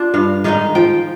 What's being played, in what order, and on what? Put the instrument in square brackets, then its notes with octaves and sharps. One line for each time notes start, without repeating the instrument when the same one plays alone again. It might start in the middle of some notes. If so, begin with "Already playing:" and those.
Already playing: [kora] D4 F4
G2 F5
D#3 G#3 D#4 F5
F3 G5